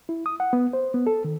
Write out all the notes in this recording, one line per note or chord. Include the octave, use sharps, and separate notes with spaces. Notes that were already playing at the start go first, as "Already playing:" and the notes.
E4
D#6
F#5
B3
C5
B3
A4
D#3